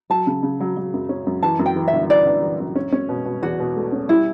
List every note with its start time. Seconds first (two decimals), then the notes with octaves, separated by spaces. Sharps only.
0.10 F#3 A5
0.27 C#3
0.43 C#3
0.60 F#3
0.77 F#3
0.94 F#2
1.09 C#4
1.27 F#2
1.43 E3 A5
1.59 F#2
1.66 G5
1.76 E3
1.88 E5
1.93 G1
2.10 E3 D5
2.26 G1
2.43 E3
2.60 F#2
2.76 C#4
2.92 C#4
3.09 B2
3.25 B2
3.43 E2 F#4
3.59 B2
3.76 A3
3.92 C#4
4.09 G3 E4